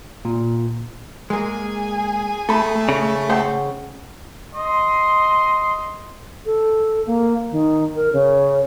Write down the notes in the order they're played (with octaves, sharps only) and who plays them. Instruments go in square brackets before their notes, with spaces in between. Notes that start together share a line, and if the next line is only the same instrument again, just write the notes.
[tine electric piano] A#2
[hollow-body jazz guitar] G#3 A#3 [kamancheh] G#4 G#5
[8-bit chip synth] A3 [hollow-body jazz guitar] A4 B5
[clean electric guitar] C#3
[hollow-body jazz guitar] C5 F#5 G5
[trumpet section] D#5 C6
[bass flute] A4
A#3
D#3
A#4
C#3